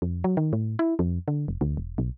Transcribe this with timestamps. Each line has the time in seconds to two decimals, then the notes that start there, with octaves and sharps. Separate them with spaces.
0.02 F2
0.24 F#3
0.37 D#3
0.53 A2
0.79 E4
0.99 F2
1.28 D3
1.48 F1
1.61 D2
1.77 E1
1.98 B1